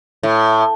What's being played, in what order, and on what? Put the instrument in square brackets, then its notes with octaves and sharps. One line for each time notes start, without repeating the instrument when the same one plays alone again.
[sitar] A2